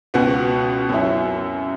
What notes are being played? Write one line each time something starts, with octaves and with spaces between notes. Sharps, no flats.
C#2 B2 B3 F#4
F#2 F#3 E4